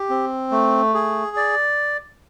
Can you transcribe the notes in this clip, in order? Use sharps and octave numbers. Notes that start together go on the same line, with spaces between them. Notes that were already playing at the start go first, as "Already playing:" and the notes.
Already playing: G4
C4
A3
G#4
D5